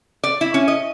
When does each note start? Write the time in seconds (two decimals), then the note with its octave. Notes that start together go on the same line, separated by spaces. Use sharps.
0.24 D5
0.41 E4
0.54 C#4
0.68 D#5